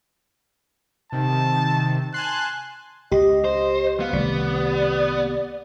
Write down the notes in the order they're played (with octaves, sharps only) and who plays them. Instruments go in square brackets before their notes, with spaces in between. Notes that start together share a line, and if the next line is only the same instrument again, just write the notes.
[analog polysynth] C3 D#3 [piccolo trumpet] A5
[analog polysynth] G#5 A5 C6 [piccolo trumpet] F#6
[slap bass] C#2 [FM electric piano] G4 [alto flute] D#5
[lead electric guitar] C5
[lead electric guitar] B3 [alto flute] F5
[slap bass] C2 D#3 A3 [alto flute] D5